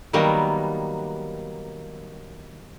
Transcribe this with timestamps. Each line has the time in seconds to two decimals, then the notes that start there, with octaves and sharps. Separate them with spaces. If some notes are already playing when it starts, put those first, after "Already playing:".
0.13 D#3 F#3 G3 A#3 B3